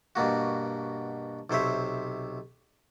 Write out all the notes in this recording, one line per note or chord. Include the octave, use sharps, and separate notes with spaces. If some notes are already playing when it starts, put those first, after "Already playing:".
G2 B2 A#3 F#4
B1 C3 C5 C#5 E5